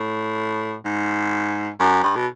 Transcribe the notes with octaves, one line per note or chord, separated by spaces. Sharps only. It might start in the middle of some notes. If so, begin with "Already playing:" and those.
Already playing: A2
G#2
F#2
G2
B2